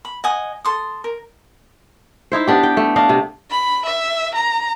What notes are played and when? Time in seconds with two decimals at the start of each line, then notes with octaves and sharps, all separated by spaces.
0.05 B5
0.24 D#5 F#5 G#5 D#6
0.65 A4 C6 D#6
1.04 A#4
2.32 D#4 E4 C5
2.47 B3 D4 G4
2.63 G5
2.77 A3
2.96 D4 D#5 F5
3.09 C3
3.50 B5
3.86 E5
4.35 A#5